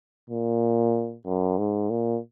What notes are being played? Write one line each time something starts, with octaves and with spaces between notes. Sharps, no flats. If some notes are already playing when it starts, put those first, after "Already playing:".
A#2
F#2
G#2
A#2